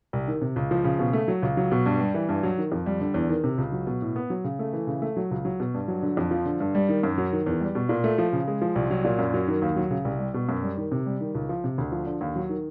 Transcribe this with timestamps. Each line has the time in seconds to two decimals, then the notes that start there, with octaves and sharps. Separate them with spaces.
0.13 C2
0.27 D#3
0.41 C3
0.56 C#2
0.71 F3
0.84 C#3
0.99 B2
1.13 A3
1.28 F#3
1.43 C#2
1.57 F#3
1.72 B2
1.86 G2
2.00 G3
2.14 E3
2.29 G2
2.43 F#3
2.58 D#3
2.72 F2
2.86 G3
3.01 D3
3.14 E2
3.30 D#3
3.44 C3
3.58 C#2
3.72 F#3
3.87 B2
4.02 A2
4.16 B3
4.30 F#3
4.44 C#3
4.59 A3
4.73 E3
4.87 C#3
5.02 A3
5.17 F#3
5.31 C#2
5.45 F#3
5.60 B2
5.74 G2
5.88 F#3
6.03 D3
6.17 F2
6.31 F3
6.46 D3
6.60 G2
6.75 G3
6.89 D#3
7.03 F#2
7.18 F#3
7.33 D#3
7.46 E2
7.61 G3
7.75 B2
7.89 A#2
8.04 A3
8.18 F3
8.33 C#3
8.48 G#3
8.62 F3
8.76 C2
8.91 F#3
9.04 A#2
9.19 F#2
9.34 F#3
9.48 D#3
9.62 D#2
9.76 F#3
9.91 C#3
10.05 C2
10.19 G3
10.34 B2
10.49 F#2
10.62 G3
10.77 D#3
10.92 C3
11.06 G3
11.21 D#3
11.35 C#2
11.49 F3
11.64 C3
11.78 D2
11.92 F3
12.07 D3
12.21 D#2
12.36 F#3
12.49 D#3